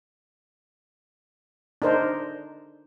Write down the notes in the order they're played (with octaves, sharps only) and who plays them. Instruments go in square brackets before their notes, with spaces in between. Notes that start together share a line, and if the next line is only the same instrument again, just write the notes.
[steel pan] D4 D#4 A#4 C5